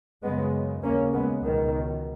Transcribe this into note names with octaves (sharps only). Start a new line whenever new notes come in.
F#2 C#3 G#3 B3
D#2 C#3 A#3 C#4
G#3 B3
C#2 B2 D#3